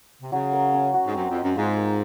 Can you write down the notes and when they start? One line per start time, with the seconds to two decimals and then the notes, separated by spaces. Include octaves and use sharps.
0.21 C3
0.31 C#3 F#3
0.53 A#4
0.74 C#4
0.94 F#4
1.05 G#2
1.15 F#2 C4
1.29 F2
1.36 D#5
1.42 F#2
1.56 G#2 F4
1.77 A#4